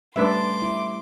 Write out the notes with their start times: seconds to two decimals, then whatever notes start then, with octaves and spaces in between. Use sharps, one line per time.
0.16 G3 A3 C#4 D4 B4 E5 C6 D6
0.62 E4